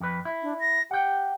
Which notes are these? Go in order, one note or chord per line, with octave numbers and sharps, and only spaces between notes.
F2 B4
E4
D4
A#6
G4 F#5 G5